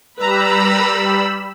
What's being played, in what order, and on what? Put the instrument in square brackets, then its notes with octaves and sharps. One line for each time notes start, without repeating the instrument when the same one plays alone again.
[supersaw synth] G3 B5 E6 [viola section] B4 A#5